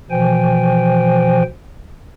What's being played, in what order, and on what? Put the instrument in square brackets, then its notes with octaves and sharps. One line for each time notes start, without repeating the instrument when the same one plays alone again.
[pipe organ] B2 E3 F3 C5 G5 G#5